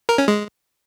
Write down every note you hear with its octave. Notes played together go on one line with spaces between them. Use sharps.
A#4
C#4
G#3